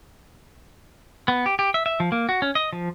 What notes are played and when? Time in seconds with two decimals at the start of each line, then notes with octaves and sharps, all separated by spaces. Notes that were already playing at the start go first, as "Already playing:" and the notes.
1.28 B3
1.46 G4
1.59 G4
1.74 E5
1.86 E5
2.00 F3
2.12 A#3
2.29 F#4
2.42 C#4
2.55 D#5
2.73 F3